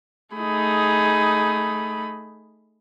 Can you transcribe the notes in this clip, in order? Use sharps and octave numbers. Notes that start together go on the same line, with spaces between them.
A3 D#4 G#4 B5